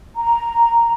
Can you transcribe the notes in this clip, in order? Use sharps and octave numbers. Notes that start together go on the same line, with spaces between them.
A#5